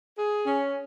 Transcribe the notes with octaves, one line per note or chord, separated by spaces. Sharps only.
G#4
C#4